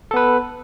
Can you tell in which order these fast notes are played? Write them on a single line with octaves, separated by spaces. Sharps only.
A4 B3 B4